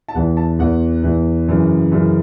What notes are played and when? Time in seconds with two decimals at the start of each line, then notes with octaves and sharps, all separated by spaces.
0.08 A5
0.14 E2 E3 F#5
0.37 A5
0.59 E2 E3 F#5
1.03 E2 E3
1.48 F#2 C#3 E3
1.92 F#2 C#3 E3